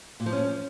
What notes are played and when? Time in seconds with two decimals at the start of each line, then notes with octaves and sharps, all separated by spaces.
0.20 A#2
0.26 F3
0.32 C#4